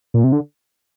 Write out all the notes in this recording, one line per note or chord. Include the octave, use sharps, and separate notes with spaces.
A#2
C3
D3